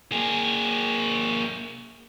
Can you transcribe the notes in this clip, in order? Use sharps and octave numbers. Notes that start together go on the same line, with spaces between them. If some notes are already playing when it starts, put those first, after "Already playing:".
A#3 G#4